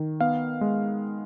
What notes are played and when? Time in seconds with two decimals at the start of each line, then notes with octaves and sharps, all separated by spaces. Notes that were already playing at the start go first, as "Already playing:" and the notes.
Already playing: D#3
0.21 B3 F5
0.61 G#3